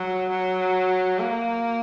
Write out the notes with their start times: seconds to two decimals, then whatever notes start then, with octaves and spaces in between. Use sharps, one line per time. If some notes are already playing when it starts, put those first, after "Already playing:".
Already playing: F#3
0.29 F#3
1.19 A#3